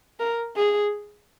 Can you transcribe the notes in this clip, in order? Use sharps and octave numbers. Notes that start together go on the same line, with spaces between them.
A#4
G#4